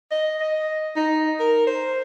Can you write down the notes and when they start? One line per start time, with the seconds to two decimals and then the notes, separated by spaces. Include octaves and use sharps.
0.11 D#5
0.40 D#5
0.96 D#4
1.40 A#4
1.67 C5